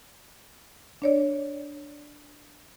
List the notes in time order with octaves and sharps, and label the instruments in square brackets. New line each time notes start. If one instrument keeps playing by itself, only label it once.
[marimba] D4 C#5 D5